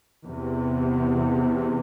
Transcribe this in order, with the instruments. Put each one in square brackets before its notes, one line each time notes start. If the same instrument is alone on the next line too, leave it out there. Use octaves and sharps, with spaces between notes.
[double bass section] E2 C3